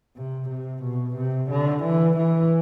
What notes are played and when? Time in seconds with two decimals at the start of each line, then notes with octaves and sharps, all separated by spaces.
0.16 C3
0.50 C3
0.83 B2
1.17 C3
1.50 D3
1.84 E3
2.17 E3